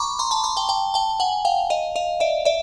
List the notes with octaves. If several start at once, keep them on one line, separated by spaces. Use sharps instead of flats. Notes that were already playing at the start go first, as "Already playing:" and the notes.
Already playing: A#5 B5 C#6 D6
A#5 C6
A5 B5
A#5 C6
G5 A5
G5 A5
G5 A5
F#5 G#5
F5 G5
D#5 F5
D#5 F5
D5 E5
D5 E5